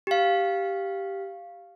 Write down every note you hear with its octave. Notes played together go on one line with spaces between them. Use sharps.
G4 F5